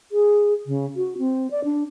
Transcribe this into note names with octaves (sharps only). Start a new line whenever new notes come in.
G#4
C#3
F#4
C4
D5
D4